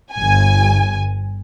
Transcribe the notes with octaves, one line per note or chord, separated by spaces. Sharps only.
G1 G#5